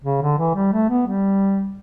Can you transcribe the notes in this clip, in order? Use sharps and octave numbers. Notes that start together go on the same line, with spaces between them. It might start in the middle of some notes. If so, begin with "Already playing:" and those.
C#3
D3
E3
G3
A3
B3
G3